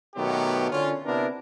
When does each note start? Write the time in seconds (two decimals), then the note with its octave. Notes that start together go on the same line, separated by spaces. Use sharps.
0.16 B2 D#3 F#3 A3 B3 G4
0.71 D3 C#4 F4
1.06 C3 B3 D4 E4 A#4